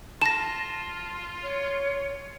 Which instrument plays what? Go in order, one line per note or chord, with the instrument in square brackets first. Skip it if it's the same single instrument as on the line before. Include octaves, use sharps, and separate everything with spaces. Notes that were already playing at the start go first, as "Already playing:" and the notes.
[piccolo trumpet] F4 [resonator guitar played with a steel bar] A5 [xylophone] A#6 E7
[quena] C#5